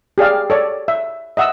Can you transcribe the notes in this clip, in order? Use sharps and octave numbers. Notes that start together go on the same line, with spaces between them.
G4 G#4 D5 F5
A4 C#5 D5
E5
D#5 E5 F#5 D#6 E6